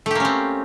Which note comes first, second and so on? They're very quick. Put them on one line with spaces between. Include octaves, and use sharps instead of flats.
A3 G4 A#3 C#4 C4